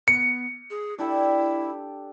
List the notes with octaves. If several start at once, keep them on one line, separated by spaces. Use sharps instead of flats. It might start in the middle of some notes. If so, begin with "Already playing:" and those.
B3 C#7
G#4
D4 E4 G4 A4